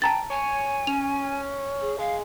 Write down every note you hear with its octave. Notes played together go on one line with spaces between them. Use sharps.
G5 A5 A#5 A6
C#5 G#5
C#4 F7
G#4
G#3 F5